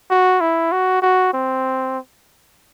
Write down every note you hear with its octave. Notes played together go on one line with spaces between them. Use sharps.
F#4
E4
F#4
F#4
C4